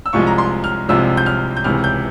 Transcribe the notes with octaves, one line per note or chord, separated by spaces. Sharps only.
E6
C2 C3 F3 G#3 C#6
A#5
C6
F6
C2 C3 F3 G#3 E6
G6
F6
G6
C#2 C3 E3 F6
G6